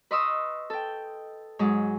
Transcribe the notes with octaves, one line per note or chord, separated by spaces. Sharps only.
B4 D#5 C6 C#6 D#6 E6
A4 G5
G#2 F#3 G#3 G#4